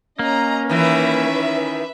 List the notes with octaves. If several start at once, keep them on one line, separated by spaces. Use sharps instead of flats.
A#3 C#4 D#5 A#5
D#3 E3 B4 E5